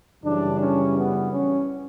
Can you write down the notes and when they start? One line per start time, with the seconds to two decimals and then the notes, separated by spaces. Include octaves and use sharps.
0.22 F#2 C#3 E3 G3 D4
0.58 C#4
0.93 B3
1.29 C#4